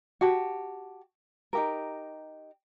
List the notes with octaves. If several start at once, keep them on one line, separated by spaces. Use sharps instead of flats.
F#4 G4 A5
D#4 G4 A#4